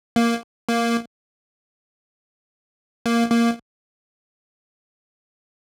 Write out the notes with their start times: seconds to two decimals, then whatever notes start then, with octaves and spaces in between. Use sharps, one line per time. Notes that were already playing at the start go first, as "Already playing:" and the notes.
0.16 A#3
0.69 A#3
3.06 A#3
3.31 A#3